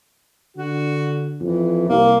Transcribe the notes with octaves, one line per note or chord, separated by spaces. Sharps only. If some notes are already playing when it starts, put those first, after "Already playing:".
D3 F#4
F2 E3
C2 A#3